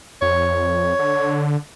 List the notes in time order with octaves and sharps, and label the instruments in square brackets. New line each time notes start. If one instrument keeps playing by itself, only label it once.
[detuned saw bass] F2 [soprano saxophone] C#5
[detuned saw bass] D3